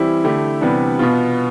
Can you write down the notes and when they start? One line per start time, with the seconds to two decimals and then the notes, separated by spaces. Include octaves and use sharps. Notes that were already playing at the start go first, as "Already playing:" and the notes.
Already playing: E3 G3 C4 E4 G4
0.24 D3 A3 E4 G4
0.61 C3 E3 G3 B3 D4
0.99 B2 B3 F4